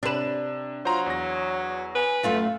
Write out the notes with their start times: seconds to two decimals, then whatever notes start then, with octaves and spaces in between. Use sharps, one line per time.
0.03 C3 D4 B4 E7
0.85 F#3 F4 C5 A#5 C6
1.06 E2 C#5 A#6
1.95 B4 G#5
2.23 F#2 A3 F4 F5